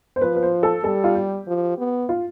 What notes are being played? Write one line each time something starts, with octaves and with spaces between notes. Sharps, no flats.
C5
F3 B4
B4
C5
A4
G3 A4
F4
G4
F3
B3
F4